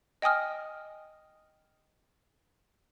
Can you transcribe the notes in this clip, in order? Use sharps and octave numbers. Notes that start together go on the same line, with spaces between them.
D#5 G5 G#5 D#6 F6